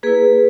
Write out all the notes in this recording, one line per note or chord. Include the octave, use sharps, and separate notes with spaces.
A#3 E4 G#4 B4